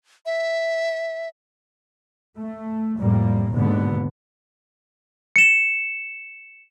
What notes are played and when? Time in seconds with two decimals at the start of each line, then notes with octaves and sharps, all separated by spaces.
0.26 E5
2.38 A3
2.99 F2 A2 G3 A#3
3.51 D#2 G#2 B2 D3 B3
5.36 C#7 E7